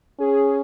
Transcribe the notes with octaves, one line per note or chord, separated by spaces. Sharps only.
C#4 G#4